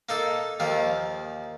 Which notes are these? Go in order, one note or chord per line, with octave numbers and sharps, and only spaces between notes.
A#3 D#4 A4
D#2 D#3 F3 A#3